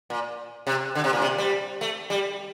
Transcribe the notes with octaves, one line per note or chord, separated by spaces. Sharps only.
A#2
C3
D3
C3
A#2
C3
G3
A3
G3